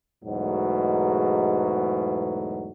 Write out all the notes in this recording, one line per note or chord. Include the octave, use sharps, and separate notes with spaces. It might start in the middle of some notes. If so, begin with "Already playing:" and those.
E2 G#2 B2 F#3 A3